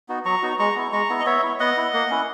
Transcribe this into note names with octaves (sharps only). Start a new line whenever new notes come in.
B3 D#4 F#4
F#3 A#5 C#6
B3 D#4 F#4
G#3 A#5 C#6
B3 E4
G#3 A#5 C#6
B3 E4
D#5
B3 C#5 E5
E4
B3 D#5 F#5
E4
A#3
C#4 E4